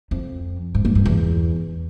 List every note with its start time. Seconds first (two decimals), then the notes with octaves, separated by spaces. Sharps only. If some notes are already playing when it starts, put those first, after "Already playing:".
0.11 F2
0.75 G#2
0.85 G#2
0.95 G2
1.05 E2